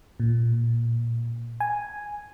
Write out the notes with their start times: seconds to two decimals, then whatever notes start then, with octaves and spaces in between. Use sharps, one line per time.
0.20 A#2
1.60 G#5